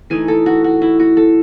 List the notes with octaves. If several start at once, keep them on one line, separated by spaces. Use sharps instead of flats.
E3 A3 D#4 G#5
A4
F#4
F#4
E4
F#4
A4